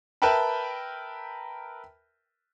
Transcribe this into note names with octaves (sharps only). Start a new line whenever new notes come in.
A#4 B4 E5 G5 A5 B5